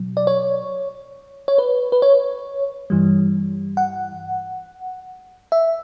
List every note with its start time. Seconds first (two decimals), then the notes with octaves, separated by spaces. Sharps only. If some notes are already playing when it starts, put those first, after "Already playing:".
Already playing: B2 F#3
0.17 D5
0.27 C#5
1.48 C#5
1.58 B4
1.92 B4
2.02 C#5
2.90 G2 E3 G3
3.77 F#5
5.52 E5